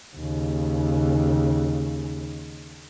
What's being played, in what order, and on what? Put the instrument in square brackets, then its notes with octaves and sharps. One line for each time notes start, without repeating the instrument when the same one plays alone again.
[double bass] D#2 C#3